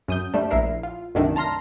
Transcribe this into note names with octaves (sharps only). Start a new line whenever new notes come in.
F#2 D#6 G6
G3 A3 D4
A#1 E4 A#4 C7
F4
C2 F#2 D3 D#3 A3 D4
A5 A#5 C6 F6 A#6